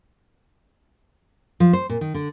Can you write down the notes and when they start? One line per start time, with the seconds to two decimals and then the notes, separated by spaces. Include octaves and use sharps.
1.60 F3
1.73 C5
1.89 A#2
2.01 D#3
2.14 D3